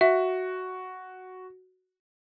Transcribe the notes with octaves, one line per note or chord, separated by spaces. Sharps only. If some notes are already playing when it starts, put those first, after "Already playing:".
F#4 E5